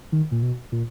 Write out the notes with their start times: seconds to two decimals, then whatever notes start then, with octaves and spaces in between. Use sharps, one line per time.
0.12 D#3
0.32 A#2
0.42 B2
0.72 A#2